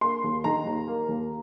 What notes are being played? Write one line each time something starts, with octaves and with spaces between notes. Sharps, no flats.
A#3 C6
D#2
D#3 A#5
D#2
A#3
D#2